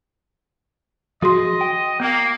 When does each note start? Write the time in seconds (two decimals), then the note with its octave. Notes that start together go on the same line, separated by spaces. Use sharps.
1.22 F3 F#4 G#4 D#5 C6
1.61 G5
2.00 A#3 B3